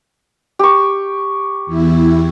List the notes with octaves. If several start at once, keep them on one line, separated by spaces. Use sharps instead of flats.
G4 C#6
E2 E4